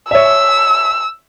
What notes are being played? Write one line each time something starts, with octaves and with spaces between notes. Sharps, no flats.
C#5 E5 E6